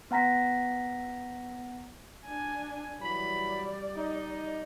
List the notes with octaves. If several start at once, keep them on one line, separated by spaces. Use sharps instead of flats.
B3 F#5 A#5 A#6 B6
D4 G#5
E3 F#3 G3 D5 B5
D#4